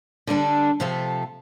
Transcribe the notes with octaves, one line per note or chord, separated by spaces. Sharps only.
D3 G3 D4 A4
C3 F3 A3 F4 A4